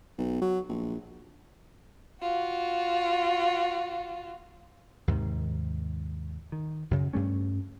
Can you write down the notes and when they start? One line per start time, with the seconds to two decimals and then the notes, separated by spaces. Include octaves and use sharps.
0.18 B1
0.42 F#3
0.69 A#1
2.22 F4 F#4
5.08 D#2 G#2 C3 D#3
6.52 D#3
6.91 F#2 C#3
7.13 G2 G3 A3 C#4